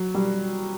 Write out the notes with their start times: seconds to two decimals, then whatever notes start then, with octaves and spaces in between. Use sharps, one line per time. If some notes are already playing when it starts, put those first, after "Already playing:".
Already playing: F#3
0.15 G3